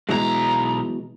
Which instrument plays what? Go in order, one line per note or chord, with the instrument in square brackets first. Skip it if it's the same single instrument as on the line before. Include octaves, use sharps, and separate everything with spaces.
[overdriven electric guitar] B1 A#5 [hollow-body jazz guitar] B2 E3 G#3